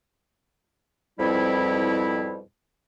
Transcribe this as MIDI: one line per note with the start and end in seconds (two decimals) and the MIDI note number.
1.19 2.41 41
1.19 2.41 44
1.19 2.41 47
1.19 2.41 55
1.19 2.41 60
1.19 2.41 64